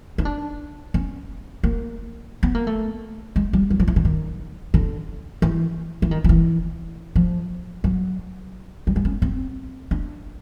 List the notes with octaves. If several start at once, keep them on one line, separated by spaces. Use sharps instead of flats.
D#4
D4
C#4
A#3
B3
A#3
A3
G#3
G3
F#3
F3
E3
D3
D#3
D3
E3
E3
D#3
F3
E3
F3
F#3
G3
G#3
C#4
C4
D4